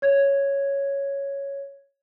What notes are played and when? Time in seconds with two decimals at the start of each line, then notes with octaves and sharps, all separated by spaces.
0.02 C#5 G#6